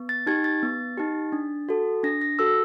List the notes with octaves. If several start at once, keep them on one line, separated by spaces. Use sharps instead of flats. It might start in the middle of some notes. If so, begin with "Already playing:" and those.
Already playing: B3
A6
D#4 G4 G#6
A6
B3
D#4 G4
D4
F#4 A4
D4 A#6
A#6
F#4 A4 E6